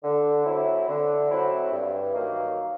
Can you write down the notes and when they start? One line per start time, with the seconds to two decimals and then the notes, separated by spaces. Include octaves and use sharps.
0.03 D3
0.45 F#3 A3 C4 E4
0.87 D3
1.29 F#3 A3 C4 E4
1.72 G2
2.13 D#3 F#3 A#3